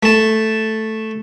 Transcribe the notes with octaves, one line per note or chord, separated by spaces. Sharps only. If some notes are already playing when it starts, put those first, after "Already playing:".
A3 A5